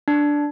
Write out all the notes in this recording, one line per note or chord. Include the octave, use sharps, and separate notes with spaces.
D4